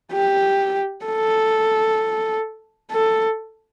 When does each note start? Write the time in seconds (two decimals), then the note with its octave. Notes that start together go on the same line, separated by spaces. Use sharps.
0.12 G4
1.05 A4
2.91 A4